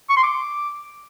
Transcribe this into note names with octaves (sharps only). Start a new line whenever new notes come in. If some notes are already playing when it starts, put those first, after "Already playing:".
C#6
C6
D6